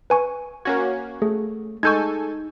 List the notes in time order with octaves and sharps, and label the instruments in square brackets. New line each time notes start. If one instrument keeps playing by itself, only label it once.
[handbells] B4 G#5 C#6
[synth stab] A#3 C#4 F#4 [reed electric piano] G#6
[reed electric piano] A3 [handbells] G#4
[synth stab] G#3 A4 G#5 [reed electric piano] D#4 [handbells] C#6 G6 G#6